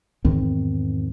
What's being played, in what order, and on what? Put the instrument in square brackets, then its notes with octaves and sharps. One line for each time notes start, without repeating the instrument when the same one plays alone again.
[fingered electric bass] E2 G#2 D#3 C4